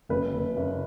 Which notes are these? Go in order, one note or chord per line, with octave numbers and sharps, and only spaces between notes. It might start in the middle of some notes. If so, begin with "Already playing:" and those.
F#1 B4
F#1
F#1